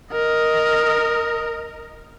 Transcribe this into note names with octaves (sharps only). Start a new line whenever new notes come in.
A#4 D#5